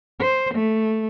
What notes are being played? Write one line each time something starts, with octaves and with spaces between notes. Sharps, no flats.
C5
A3